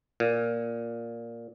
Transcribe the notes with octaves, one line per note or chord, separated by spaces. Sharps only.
A#2